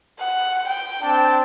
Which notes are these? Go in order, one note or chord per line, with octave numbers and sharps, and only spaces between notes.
F#5
G5
C4 D4 A5